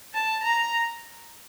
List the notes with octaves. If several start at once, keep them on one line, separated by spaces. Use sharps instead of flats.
A5
A#5